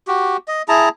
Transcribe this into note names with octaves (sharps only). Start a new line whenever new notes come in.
F#4 G4
D#5
E4 G#4 A5 A#5